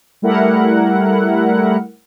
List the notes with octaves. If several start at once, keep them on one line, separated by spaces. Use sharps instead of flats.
G3 A3 E4 A#4 F#5